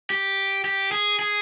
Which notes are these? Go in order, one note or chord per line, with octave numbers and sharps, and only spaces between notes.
G4
G4
G#4
G#4